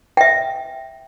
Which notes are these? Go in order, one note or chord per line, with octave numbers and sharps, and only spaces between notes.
E5 G5